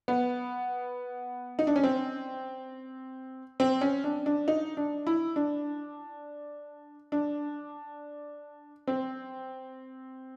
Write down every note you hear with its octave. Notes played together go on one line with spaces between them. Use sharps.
B3
D#4
D4
C#4
C4
C4
C#4
D4
D4
D#4
D4
E4
D4
D4
C4